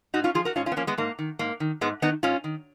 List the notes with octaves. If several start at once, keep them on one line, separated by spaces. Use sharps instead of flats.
G#2 D#4 F#4
C#4 F4
F3 F4 G#4
F#4 A#4
G#2 C#4 F4
C#4 F4
B3
F3 A#3 C#4
G#3 B3
G#2 A#3
D#3
G#2 A#3
D#3
G#2 G#3 B3
D#3 B3 D#4
G#2 C#4 F4
D#3